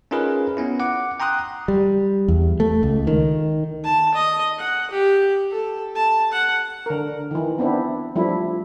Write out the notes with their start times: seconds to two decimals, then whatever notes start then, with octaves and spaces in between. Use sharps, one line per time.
0.11 C#4 D#4 F4 G#4 A#4 B4
0.57 B3 C#4 E4
0.80 F#5 D6
1.20 G5 A#5 C6 D#6 F#6
1.68 G3
2.28 E2
2.60 A3
2.83 C#2
3.07 D#3
3.84 A5
4.14 D#5
4.59 F#5
4.90 G4
5.51 A4
5.95 A5
6.32 F#5
6.86 D3 A#4
7.31 D#3 E3
7.58 B3 C4 D4 E4
8.16 F3 G3 A3 D4 E4